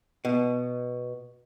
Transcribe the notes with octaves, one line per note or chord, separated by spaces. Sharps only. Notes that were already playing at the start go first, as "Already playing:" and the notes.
B2